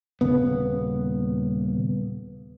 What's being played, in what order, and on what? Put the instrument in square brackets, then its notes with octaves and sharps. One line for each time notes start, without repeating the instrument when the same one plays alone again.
[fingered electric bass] D#1 C#3 B3